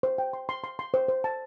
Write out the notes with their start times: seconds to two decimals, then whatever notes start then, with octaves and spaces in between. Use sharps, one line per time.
0.03 C5
0.18 G5
0.33 C6
0.49 C6
0.64 C6
0.79 C6
0.94 C5
1.09 C5
1.24 A5